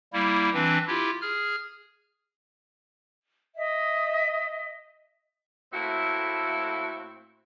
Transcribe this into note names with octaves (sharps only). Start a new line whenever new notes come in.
G3 A#3 E4
E3 C4 D4 B4
E4 F4 G4
G#4 F6
D#5 E5
A2 A3 A#3 C4 E4 F#4